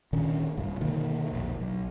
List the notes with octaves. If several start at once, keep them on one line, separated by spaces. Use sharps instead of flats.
A#2 D#3 C#4 D4
C2 G2
B2 D3 D#3 A#3
E1 A#1
B1